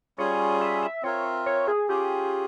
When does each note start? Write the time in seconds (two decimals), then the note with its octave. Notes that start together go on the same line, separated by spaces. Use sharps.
0.18 G3 C#4 F4 G#4 C#5
0.61 E5
0.82 E5
1.03 C4 F4 A#4 C#5 E5
1.46 C#5
1.68 G#4
1.89 C#4 F4 G4 G#4